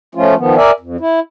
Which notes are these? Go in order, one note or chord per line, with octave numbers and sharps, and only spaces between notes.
F3 A3 C#4 F4
D#3 F3 B3
A#4 D5 E5 G#5
F2
E4